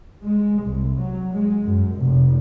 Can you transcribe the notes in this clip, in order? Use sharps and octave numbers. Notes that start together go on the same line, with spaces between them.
G#3
C2
F#3
G#3
F#2
F1